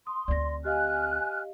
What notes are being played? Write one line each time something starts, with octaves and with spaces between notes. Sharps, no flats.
C6 D#6
D2 C4 D5 A#6
G4 D#5 F5 G#5 F6 F#6